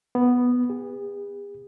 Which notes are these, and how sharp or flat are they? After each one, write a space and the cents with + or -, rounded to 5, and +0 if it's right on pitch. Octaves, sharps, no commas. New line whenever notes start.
B3 +0
G#4 -45